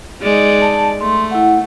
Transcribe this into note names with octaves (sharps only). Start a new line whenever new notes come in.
G#3 D#4 D5
A5
A3 C6
E4 F#5